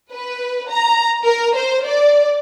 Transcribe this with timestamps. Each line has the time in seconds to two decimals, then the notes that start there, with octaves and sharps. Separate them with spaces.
0.13 B4
0.70 A#5
1.25 A#4
1.55 C5
1.86 D5